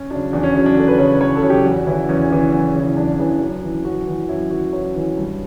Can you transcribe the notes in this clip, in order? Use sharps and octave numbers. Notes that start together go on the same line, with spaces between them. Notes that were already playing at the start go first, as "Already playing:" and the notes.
Already playing: C#4
C#3 F#3 D4
E2 D4
C#4
C#3 F#3 C#4
D4
E2 A4
B4
C#3 F#3 C#5
E2 C#5
A4
C#3 F#3
G4
E2 F#4
C#3 E3 E4
E2 C#4
C#3 E3
E2
C#3 E3
E2 D4
C#3 E3
F#2
E3
F#2 F#4
E3
F#2 E4
E3 F#4
F#2 C#5
E3
G2